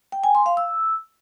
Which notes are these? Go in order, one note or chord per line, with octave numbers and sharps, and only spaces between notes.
G5
G#5
C6
F5
E6